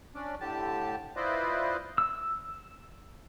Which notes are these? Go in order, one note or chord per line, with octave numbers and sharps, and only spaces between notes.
C#4 D4 D5
A2 D3 G4 A5
E4 F4 B4 C5 D5 D#5
E6